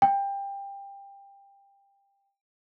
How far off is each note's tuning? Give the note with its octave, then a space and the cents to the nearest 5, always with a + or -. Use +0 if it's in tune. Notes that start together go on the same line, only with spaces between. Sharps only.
G5 +20